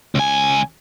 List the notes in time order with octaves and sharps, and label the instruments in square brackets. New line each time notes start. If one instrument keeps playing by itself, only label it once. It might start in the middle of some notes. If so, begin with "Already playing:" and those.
[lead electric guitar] C#2 G#5